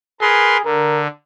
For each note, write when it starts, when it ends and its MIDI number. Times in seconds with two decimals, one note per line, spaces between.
0.21 0.60 68
0.21 0.57 70
0.21 0.57 71
0.21 0.57 84
0.65 1.07 50
0.65 1.03 70